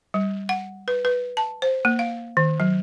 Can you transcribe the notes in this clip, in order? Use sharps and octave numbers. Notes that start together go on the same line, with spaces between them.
G3
F#5
B4
B4
A5
C5
A#3
F5
D#3
F#3